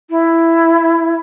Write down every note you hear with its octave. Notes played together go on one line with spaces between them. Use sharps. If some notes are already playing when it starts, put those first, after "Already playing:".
E4